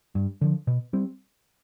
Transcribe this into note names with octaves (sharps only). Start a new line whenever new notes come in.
G2
D3 F3
B2
G3 C4